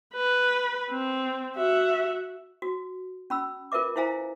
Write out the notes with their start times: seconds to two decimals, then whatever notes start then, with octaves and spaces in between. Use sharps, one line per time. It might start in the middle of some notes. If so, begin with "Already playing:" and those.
0.14 B4
0.90 C4
1.57 F#4 E5
2.62 F#4
3.30 C#4 B5 E6
3.72 F4 A#4 B4 E5 D6
3.96 E4 C5 E5 F5 G#5 A#5